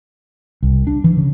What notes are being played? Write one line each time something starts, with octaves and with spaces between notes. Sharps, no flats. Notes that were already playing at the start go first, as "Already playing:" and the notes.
C2
D4
E3
C#3